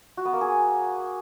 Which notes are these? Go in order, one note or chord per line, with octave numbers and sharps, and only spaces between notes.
F#4
B3
A#3
G#4